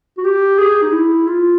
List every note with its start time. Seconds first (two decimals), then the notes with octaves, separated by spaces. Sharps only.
0.18 F#4
0.24 G4
0.59 G#4
0.82 D#4
0.92 E4
1.27 F4